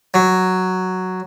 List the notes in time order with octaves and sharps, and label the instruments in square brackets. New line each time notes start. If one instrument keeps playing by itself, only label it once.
[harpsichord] F#3